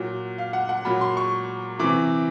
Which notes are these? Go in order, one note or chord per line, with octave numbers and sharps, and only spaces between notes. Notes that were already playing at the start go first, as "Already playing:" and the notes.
Already playing: A#2 F#3
F5
F#5
F#5
A#2 F#3 B5
C6
C#6
C3 E3 D6